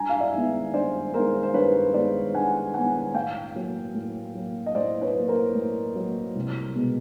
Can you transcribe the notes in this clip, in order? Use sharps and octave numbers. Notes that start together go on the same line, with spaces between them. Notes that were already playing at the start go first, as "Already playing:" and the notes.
Already playing: G2 G#5 A#5
F5
D5 E5
D#3 G#3 B3
G2 C5 D5
D#3 G#3 B3 A#4 C5
C5
G2 B4 C#5
D#3 G#3 B3 C5 D5
G2 F#5 G#5
D#3 G#3 B3 F#5 G#5
A2 F5 G5
F#3 A#3
A2
F#3 A#3
D#5
A2 C5 D5
B4 C#5
F#3 A#3
A#4 C5
A2
F#3 A#3
C2
B2 G#3 B3